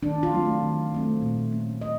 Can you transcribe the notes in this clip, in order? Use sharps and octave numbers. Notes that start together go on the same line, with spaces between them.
D#3 D4
F4
F#3 A3 C4
D#3
F#3 A3 C4
A#2
F#3 A3 C#4
A#2 D#5